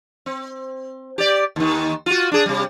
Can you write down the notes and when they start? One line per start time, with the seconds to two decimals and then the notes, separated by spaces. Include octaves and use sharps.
0.26 C4
1.18 G4 D5
1.56 D#2 D#3
2.06 F4 F#4
2.32 D4 G#4
2.46 C3 G3